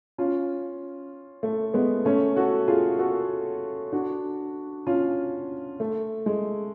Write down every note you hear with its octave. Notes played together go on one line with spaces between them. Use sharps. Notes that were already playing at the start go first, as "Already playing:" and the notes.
C#4 F4
A3
G#3 B3
A3 C#4
F#4 A4
F4 G#4
F#4 A4
D4 F#4
C#4 F4
A3
G#3